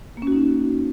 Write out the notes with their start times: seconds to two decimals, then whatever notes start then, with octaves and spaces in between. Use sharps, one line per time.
0.17 A#3
0.22 C#4
0.27 F#4
0.32 D#4